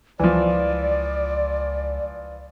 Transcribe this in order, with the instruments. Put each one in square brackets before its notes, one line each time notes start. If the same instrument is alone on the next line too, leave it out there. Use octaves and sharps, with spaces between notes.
[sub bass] C#2 [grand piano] E3 F3 [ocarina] D5